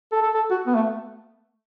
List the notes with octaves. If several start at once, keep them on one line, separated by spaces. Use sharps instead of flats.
A4
A4
A4
F#4
B3
A3